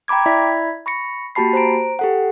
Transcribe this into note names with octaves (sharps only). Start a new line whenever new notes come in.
G5 A#5 B5 D6 G#6
E4 D5 E5 B5 G#6 B6
B5 C#6 A#6 C#7
A#3 F#4 G4 A5 B5 C7
C5 A#5 D7
G4 A4 F#5